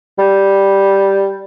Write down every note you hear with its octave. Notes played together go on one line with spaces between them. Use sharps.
G3